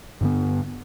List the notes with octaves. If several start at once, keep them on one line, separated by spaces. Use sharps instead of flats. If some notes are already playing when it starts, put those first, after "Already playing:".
G2 D3 B3